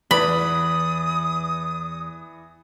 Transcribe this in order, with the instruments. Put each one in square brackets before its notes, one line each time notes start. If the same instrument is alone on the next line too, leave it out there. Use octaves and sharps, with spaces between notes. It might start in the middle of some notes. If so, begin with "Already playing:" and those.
[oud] E2 [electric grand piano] E3 B4 D5 [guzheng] B5 [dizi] D#6